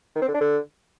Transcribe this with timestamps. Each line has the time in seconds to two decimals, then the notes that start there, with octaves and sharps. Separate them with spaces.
0.15 D#3
0.22 C4
0.28 D3
0.34 D4
0.40 D3